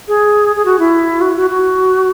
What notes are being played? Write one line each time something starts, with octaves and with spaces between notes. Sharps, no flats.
G#4
G#4
F#4
E4
F#4
F#4
F#4